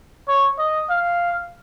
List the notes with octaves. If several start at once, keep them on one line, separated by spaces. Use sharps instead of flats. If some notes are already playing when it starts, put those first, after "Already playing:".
C#5
D#5
F5